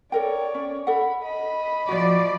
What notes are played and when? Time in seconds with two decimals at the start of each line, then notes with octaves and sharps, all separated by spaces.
0.12 A4 A#4 C#5 D5 G5
0.55 C#4
0.87 A4 F#5 B5
1.22 D#5 B5
1.89 F3 F#4 D5